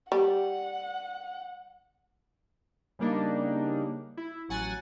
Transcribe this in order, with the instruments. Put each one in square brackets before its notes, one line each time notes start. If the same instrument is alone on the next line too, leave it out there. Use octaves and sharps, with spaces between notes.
[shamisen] G3 [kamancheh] F#5
[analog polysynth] C#3 G3 A#3 D4 D#4
E4
A1 F#3 F#5 G#5 A6